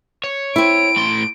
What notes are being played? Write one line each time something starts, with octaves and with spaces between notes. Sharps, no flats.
C#5
C4 E4 D7
A2 C6